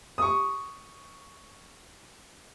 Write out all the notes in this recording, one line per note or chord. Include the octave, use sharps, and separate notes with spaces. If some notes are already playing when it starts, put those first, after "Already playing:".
C#6 D#6